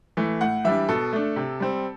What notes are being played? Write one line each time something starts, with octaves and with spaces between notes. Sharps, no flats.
E3 A3
A2 F#5
E3 G3 D4 E5
B2 A4
A3 D4
C3
G3 C4